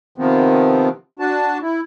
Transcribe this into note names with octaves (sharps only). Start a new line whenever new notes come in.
C3 D#3 F3 B3 C4
D4 F#4 A5
E4